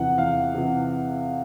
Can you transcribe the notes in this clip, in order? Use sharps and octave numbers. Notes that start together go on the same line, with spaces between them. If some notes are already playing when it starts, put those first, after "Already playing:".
Already playing: E2 C3 E3 F#5
E2 F5
C3 E3